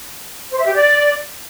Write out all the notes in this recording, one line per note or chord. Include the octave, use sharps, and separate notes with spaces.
C5
E5
G4
D5